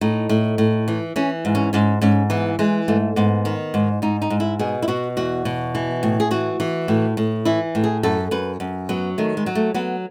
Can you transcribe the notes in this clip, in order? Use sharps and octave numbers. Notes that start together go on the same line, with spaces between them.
A2 D#4
A2
A2
E3
E3 C#4
G#2
C#4
G#2 C#4
G#2 C#4
E3 B3
E3 G#3
G#2 A3
G#2 B3
D#3
G#2
G#2 D#4
D#4
G#2
E4
B2 G#4
E4
B2 F#4
E2 F#4
B2
E3
A2
G#4
E3 F#4
E3
A2
A2
E3 E4
A2
G#4
F#2 A4
F#2 B4
F#2
F#3 B3
D#3 A3
G#3
F#3
A3
F#3 B3